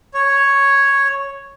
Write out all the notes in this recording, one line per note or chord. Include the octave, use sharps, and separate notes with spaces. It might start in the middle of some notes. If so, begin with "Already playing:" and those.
C#5